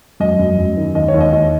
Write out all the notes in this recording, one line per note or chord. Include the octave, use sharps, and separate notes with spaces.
F#2 D#5
F#2
F#2
D#3
D#2 D#5
C#5
D#2
D#5
D#2 D#5